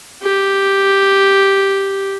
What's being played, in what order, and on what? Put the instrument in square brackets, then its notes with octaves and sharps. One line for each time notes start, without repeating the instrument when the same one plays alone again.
[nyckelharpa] G4